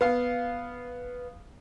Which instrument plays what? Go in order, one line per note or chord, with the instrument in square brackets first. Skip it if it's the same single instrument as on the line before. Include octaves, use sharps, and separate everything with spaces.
[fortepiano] B3 F5